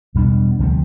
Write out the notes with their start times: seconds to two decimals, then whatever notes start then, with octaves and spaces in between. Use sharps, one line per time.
0.14 E2 B2 G3 D4
0.59 D2 C3 F3 A3